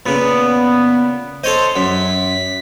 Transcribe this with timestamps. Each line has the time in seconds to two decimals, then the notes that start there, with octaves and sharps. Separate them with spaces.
0.06 A#2 C#3 B3
1.44 A4 C5 C#5 D#5
1.76 F#2 B6